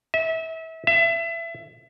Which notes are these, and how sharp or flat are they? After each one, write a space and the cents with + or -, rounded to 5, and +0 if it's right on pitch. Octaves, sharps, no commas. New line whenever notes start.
E5 -30
E5 +25